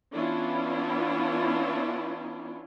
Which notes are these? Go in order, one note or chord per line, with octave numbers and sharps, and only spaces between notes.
E3 B3 C#4 D4 E4 F4